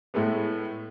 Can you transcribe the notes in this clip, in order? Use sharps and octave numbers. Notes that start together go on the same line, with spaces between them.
A2 G#3 A3 B3